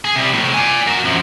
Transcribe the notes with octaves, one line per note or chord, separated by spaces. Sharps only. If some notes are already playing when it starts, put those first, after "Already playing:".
G#4
C3 G3
A2 C3
D5 G#5
F#4 A#4
F#2 F3